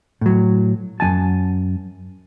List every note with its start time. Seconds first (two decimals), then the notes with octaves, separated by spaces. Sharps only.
0.21 A2 F#3
1.00 F#2 G#3 G#5 A5